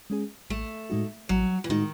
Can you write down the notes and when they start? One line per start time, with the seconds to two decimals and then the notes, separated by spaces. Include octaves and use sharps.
0.10 G#3 C#4 G#4
0.50 A1 A3
0.90 A2 G#3 D#4 F#4
1.29 A1 F#3
1.64 E3
1.69 A2 D#3 G#3 D#4 F#4